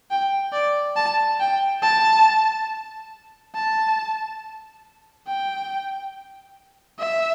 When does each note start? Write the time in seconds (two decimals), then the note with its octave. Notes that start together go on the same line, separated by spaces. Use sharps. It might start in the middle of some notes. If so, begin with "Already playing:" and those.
0.11 G5
0.53 D5
0.96 A5
1.40 G5
1.82 A5
3.55 A5
5.27 G5
6.99 E5